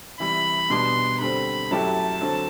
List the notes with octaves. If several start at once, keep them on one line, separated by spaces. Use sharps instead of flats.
C3 E3 G3 B5
B2 G3 B3 D4 C6
D3 G3 C4 B5
F#2 F#3 A3 E4 G4 A5
D3 F#3 C4